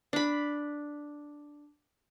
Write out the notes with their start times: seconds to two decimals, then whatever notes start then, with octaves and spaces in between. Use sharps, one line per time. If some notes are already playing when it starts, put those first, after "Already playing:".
0.13 D4 B5